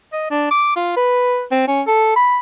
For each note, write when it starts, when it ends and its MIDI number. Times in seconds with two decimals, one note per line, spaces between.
0.12 0.30 75
0.30 0.49 62
0.51 0.71 86
0.76 0.92 65
0.96 1.43 71
1.51 1.64 60
1.68 1.82 61
1.87 2.15 69
2.16 2.40 83